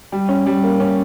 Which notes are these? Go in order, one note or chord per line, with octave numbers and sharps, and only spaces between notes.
G3
C#4
G3
A#3
C#4